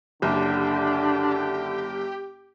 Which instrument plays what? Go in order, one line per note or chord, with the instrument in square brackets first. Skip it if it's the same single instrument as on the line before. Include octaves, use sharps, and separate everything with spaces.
[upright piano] F#1 [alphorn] D3 [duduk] D4 [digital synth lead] G4